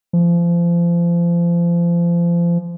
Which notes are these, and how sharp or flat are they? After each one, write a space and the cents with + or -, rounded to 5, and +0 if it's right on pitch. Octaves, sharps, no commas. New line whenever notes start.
F3 -30